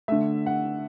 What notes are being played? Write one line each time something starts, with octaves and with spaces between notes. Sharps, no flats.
D3 A3 E5
F#5